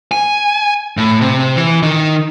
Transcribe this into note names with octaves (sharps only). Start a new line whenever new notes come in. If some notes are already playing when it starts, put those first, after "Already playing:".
G#5
A2
C3
E3
D#3